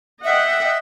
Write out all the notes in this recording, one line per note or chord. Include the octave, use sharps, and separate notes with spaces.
D#5 E5 F#5 G5